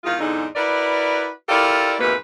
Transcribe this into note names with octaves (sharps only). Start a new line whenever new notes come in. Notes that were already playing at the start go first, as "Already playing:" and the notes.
E2 D#3 G#3 F4
E2 G#2 D3 D4 D#4
E4 F#4 A#4 B4 D5
E4 F4 G4 A4 A#4 D5
F2 G#2 B2 E3 A#3 B4